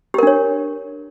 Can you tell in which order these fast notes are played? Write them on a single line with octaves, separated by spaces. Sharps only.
G4 A#4 D4 C#5